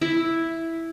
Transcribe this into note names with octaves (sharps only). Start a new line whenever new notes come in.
E4